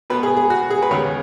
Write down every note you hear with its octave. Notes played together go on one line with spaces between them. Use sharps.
B2 B3 B4
G#4
G#4
F#4
G#4
B4
D#2 C#3 B3 C#5